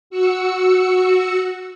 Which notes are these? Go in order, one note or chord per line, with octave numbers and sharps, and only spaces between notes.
F#4 E6 C#7